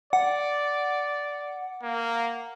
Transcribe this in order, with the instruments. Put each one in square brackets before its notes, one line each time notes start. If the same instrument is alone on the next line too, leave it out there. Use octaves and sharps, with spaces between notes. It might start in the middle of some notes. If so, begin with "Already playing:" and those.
[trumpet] D5 [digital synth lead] F#5
[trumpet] A#3